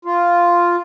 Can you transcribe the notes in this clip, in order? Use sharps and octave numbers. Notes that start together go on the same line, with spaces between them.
F4